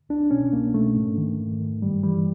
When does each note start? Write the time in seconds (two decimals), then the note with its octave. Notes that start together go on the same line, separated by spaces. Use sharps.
0.09 C2 D4
0.31 B2 C#4
0.53 C2 A#3
0.74 B2 A3
0.95 G#2
1.18 D#3
1.39 G#2
1.60 D#3
1.81 G2 G3
2.03 E3 G3